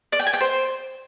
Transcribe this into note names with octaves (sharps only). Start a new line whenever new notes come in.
D5
G5
G#5
G5
C5